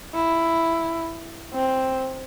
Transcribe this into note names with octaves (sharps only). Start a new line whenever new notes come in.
E4
C4